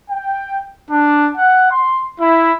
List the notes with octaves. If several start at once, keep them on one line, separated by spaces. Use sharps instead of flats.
G5
D4
F#5
C6
E4